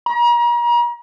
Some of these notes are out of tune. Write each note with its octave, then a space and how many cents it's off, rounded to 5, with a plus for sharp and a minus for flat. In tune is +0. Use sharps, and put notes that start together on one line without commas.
A#5 +40